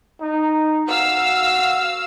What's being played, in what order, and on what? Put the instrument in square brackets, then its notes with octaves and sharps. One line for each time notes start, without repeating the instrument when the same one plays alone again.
[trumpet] D#4
[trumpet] F#4 [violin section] F5 E6